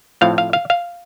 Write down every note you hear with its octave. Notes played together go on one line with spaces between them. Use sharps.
A2 F3 A3 C4 F5
F5
F5
F5